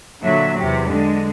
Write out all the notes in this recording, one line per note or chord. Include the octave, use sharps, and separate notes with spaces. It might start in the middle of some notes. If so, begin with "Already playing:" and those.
A#2 D3 F#3 E5
E2 C3 G4
D3 G#3